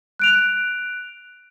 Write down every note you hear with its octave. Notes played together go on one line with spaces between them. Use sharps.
F#6 D7 F7